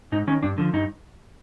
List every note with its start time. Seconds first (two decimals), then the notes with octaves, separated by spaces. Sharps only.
0.12 G#2 D#4
0.27 D#3 C#4
0.43 G2 D4
0.58 D3 F3
0.73 G2 D#4